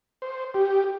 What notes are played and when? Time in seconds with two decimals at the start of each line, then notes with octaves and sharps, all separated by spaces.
0.22 C5
0.54 G4